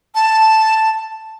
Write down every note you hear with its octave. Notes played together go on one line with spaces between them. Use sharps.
A5